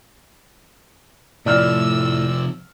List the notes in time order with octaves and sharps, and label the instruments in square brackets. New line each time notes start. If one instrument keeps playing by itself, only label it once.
[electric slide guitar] A2 [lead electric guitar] C3 F3 [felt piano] D5 F6 [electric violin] E6